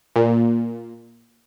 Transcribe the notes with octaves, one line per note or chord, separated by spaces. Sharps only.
A#2